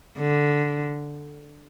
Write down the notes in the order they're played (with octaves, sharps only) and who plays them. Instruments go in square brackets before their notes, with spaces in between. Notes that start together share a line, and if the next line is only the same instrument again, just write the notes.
[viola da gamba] D3